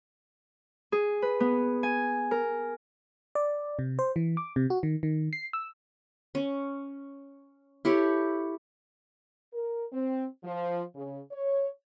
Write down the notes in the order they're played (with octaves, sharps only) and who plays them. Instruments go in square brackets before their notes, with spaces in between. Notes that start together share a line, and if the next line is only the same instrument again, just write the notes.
[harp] G#4
B4
B3
G#5
A#4
[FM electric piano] D5
C3
C5
E3
D6
C3
F#4
D#3
D#3
C7
E6
[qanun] C#4
E4 G4 A4 C#5
[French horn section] A#4
C4
F3
C#3
C#5